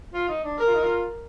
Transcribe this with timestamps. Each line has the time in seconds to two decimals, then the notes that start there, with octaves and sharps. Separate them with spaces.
0.13 F4
0.28 D#4
0.44 D4
0.58 A#4
0.67 F4
0.75 D#4
0.83 F4